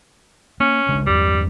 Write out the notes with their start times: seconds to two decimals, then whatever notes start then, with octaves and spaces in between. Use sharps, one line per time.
0.60 A#3 C#4
0.89 C#3 G#3 D4
1.06 E2 G2 G3